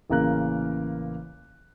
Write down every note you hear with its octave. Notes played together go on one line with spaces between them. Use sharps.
A1 C#3 A#3 A#4 F#6